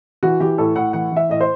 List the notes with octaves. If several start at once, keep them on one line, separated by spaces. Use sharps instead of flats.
E3 F#4
E3 G4
A2 A4
A2 F#5
E3 F#5
E3 E5
A2 D#5
C5